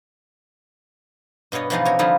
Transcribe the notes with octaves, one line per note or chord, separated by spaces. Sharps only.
G2 B2 B3 C#5 D#5
B2 E3 F3 B3 D#4 G#4
C3 C#5 G#5 A#5
D3 F3 G3 D#4 E4